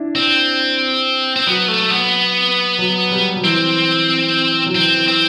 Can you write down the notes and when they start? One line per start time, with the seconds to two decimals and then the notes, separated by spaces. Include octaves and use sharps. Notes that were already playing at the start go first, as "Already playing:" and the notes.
Already playing: D4 E4
0.15 C4
1.36 C4
1.47 F#3 B3
1.68 A3
1.90 B3
2.78 F#3
3.11 G3
3.36 F#3
3.44 E3 C4
4.66 F#3
4.74 E3 C4
4.97 E3
5.08 C4